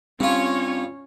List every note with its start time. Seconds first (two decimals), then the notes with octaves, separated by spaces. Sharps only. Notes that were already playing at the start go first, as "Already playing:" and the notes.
0.20 G2 C4 C#4 F4 C#5